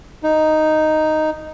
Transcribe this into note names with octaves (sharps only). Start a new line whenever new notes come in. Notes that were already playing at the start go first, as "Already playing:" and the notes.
D#4